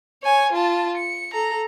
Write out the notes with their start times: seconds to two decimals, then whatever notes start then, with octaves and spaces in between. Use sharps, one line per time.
0.23 C#5 G#5
0.53 F4 A5
0.97 C#7
1.33 A4 A#5